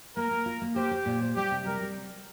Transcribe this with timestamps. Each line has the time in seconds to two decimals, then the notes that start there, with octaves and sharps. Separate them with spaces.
0.17 A#3 A#4
0.31 A#3
0.46 F4
0.62 A#3
0.76 G4 C5
0.91 C5
1.06 A#2
1.21 C5
1.36 G3 G4
1.51 C3
1.65 G3 A#4
1.81 G3